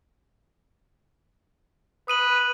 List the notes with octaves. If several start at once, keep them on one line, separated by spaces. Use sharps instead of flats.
B4 D#6 D#7 F#7